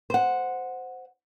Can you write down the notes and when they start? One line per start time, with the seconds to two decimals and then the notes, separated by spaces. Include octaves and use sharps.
0.10 C5 F#5